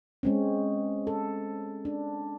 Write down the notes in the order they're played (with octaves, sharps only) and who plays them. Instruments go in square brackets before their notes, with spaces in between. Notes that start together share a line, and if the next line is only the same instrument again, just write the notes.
[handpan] G#3 C4 C#4
A4
D4